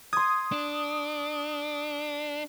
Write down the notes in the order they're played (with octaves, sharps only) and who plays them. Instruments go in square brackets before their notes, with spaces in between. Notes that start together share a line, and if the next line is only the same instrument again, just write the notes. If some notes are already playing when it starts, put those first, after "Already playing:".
[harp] C6 G#6 [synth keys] D#6
[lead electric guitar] D4